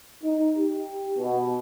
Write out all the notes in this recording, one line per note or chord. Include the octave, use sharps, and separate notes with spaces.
D#4
G4
B2